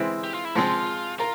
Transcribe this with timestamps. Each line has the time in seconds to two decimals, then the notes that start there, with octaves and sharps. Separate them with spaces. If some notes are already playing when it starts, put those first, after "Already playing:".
Already playing: E3 G#3 C4 E4
0.24 G4
0.34 F4
0.45 E4
0.55 F3 G#3 C4 F4
1.19 F4 A#4